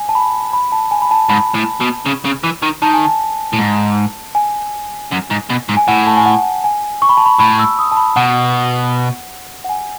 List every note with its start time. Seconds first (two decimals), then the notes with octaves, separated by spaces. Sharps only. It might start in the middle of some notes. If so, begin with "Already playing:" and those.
Already playing: G#5
0.09 A5
0.15 B5
0.53 B5
0.72 A5
0.91 G#5
1.02 B5
1.11 A5
1.29 G#2 B5
1.55 A2
1.81 B2
2.06 C#3
2.25 C#3
2.44 E3
2.63 D#3
2.82 D#3 A5
2.93 G#5
3.05 A5
3.53 A2
3.59 G#2
4.35 G#5
5.11 F#2
5.30 G#2
5.50 B2
5.69 G#2
5.77 G#5
5.88 A2 F#5
6.07 A5
6.17 G#5
6.26 F#5
6.64 G#5
7.02 C#6
7.09 B5
7.17 A5
7.26 B5
7.40 A2 B5
7.59 E6
7.79 D#6
7.92 A5
7.97 B5
8.16 B2 F#5
9.64 F#5
9.69 G#5